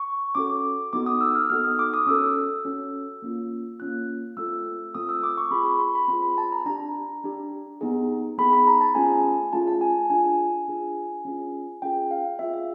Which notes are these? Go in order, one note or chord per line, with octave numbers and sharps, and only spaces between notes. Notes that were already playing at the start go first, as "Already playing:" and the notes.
Already playing: C#6
C#4 F#4 A4 D6
B3 D#4 F#4 A4 D6
D#6
E6
F6
B3 D#4 F#4 A4 F6
D#6
D6
D#6
C#4 F#4 A4 E6
C#4 F#4 A4
A#3 C#4 F4
A#3 C#4 F4 F#6
A3 C4 F4 A4 E6
A3 C4 F4 A4 D#6
E6
D6
C#6
C4 F4 G#4 B5
B5
C6
B5
C4 F4 G#4 C6
B5
A5
A#5
D4 G4 A#5
D4 G4
B3 D#4 G#4
B3 D#4 G#4 B5
B5
A#5
A5
A3 C#4 F4 G#4 G#5
A3 C#4 F4 G#4 A5
A5
G#5
D4 F4 G#4 G#5
D4 F4 G#4
C#4 F4 G#4
C#4 F4 G#4 G5
F5
C4 F4 G#4 E5
E5